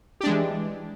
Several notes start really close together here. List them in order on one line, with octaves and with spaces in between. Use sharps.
G4 D4 G#3 E3